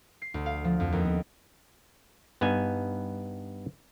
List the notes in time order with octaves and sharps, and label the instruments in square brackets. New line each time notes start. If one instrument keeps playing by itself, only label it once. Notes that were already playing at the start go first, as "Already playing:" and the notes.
[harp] C7
D2
F5
F3
F2
D#2
B3
[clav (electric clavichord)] G2 B3 D#4 G#5